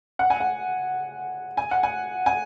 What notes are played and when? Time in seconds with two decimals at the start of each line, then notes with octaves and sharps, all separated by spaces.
0.19 F#5
0.30 G#5
0.40 F#5
1.57 G#5
1.71 F#5
1.83 G#5
2.26 G#5